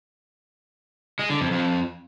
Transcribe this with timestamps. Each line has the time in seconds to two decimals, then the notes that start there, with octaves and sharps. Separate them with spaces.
1.19 G#3
1.30 D3
1.41 F2
1.51 F2